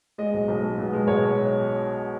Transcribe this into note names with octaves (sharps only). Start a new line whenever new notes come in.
G#3 D#5
B1
B1
G#3
B2
G#3
B1 C#5